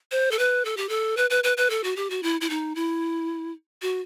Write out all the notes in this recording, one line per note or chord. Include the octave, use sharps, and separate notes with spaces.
C5
A4
B4
A4
G4
A4
B4
B4
B4
B4
A4
F#4
G4
F#4
E4
E4
D#4
E4
F#4